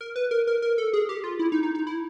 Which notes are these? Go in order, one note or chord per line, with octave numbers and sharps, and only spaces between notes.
A#4
B4
A#4
A#4
A#4
A4
G#4
G4
F4
E4
D#4
D#4
D#4
E4